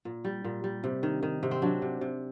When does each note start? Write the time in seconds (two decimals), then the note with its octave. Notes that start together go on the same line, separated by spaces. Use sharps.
0.05 A#2
0.25 G3
0.44 A#2
0.64 G3
0.84 C3
1.03 D#3
1.23 D#3
1.43 C3
1.51 C4
1.62 F#3 D4
1.82 C3
2.01 C3